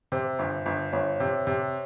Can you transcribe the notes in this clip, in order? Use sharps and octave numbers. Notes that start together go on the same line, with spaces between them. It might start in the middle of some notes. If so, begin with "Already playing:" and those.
C3 C5
G1
G1
G1 C#5
C3
C3